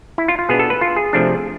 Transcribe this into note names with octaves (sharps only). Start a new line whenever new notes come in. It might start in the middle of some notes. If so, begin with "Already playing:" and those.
E4
F4
F4
B2 B3 D4 G#4
A4
B4
F4
G#4
C3 F3 A3 D4